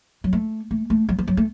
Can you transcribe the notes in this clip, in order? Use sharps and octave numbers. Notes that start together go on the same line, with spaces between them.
F#3
A3
A3
A3
F#3
F3
F#3
A3